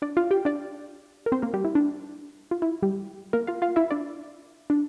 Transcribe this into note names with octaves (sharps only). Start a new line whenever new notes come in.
D4 D5
F4 F5
G4 G5
D4 D5
A#4
C4 C5
A#3 A#4
G3 G4
E4
D4
F4
E4
G3 G4
A#3 A#4
F4 F5
F4 F5
E4 E5
D4 D5
D4